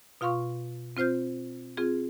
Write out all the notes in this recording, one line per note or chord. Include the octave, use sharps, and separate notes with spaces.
B2 F4 F5 C6 C#6
C4 F4 C5 F6 G6
C4 F4 G#4